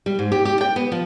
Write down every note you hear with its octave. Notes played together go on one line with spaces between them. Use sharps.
G3
G#2
G4
G4
G5
B3
F3